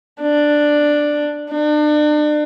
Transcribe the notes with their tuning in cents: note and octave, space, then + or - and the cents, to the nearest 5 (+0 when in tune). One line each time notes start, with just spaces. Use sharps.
D4 +5
D4 +35